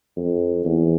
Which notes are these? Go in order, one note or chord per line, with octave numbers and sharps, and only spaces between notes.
F2
E2